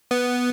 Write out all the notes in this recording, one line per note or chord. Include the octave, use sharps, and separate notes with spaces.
B3